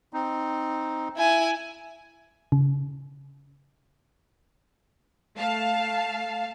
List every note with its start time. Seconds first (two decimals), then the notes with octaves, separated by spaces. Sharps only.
0.13 C4 D#4
1.17 E4 G#5
2.52 C#3
5.36 A3 F5 A5